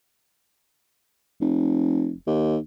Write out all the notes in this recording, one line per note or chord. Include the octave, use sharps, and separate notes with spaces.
F1
D#2